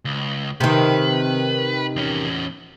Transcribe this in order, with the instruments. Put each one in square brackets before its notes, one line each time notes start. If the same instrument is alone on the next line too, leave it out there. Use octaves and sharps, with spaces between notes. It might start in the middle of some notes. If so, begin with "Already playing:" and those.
[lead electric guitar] C#2
[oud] C3 D#3 [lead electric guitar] B4
[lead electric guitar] E2 C#4